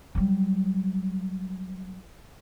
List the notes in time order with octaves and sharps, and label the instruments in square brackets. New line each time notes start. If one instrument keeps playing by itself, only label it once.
[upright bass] F#3 G3